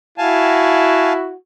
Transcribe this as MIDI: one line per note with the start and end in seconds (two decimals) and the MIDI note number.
0.18 1.34 64
0.18 1.35 66
0.18 1.13 77
0.18 1.13 80
0.18 1.13 81